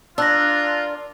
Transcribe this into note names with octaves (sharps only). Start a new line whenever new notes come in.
D4 F4 A#4 E6 F#6 A#6